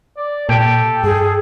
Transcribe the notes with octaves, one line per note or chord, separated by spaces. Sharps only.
D5
A#2 G4 A4
G2 G#4